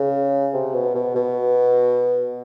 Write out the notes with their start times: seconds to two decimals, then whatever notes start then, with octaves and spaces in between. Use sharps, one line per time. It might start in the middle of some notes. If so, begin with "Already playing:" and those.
Already playing: C#3
0.54 C3
0.74 B2
0.95 B2
1.15 B2